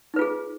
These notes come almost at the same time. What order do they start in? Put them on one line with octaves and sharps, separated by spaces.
D#4 B4 F4 G#4